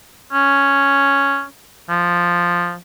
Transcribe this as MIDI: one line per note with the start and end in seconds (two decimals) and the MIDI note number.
0.33 1.43 61
1.90 2.75 53